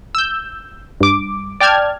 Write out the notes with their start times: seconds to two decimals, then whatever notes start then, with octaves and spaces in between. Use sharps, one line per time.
0.15 E6 G6
1.01 G2 D6
1.60 D5 G5 A5 F6 G#6